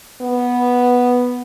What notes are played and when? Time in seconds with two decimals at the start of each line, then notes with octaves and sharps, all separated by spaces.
0.22 B3